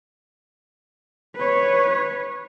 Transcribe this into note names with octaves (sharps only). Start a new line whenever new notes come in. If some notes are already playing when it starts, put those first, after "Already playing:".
B4 C#5